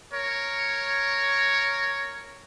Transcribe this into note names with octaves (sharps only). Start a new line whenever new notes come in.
A#4 C#5